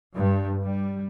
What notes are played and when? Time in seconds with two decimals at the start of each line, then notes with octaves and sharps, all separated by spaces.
0.15 G2
0.61 G3